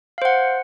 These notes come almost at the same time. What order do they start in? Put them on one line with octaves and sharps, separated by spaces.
F5 C5 F#5